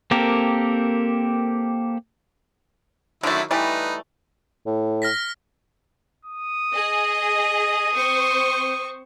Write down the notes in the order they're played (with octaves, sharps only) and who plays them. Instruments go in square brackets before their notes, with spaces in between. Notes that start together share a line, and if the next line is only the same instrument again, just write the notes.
[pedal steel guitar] A#3 C4 G4 A4 A#4
[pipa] D3 A3 [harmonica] D#3 F#3 E4
[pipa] E3 G3 A3 [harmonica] D#4 B4
[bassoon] A2
[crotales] F6 A#6 B6
[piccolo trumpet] D#6
[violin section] G#4 D#5
C4 C5 C#6